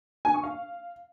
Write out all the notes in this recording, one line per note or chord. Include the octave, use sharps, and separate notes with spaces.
G#5
C#6
F5